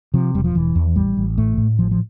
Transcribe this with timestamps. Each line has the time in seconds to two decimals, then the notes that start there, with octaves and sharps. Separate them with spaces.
0.14 C3 F3
0.35 E1 G3
0.44 F3
0.55 E1 E3
0.75 E2
0.96 A1 G3
1.17 A1
1.38 A2 A3
1.58 A2
1.79 A1 F3
1.91 F3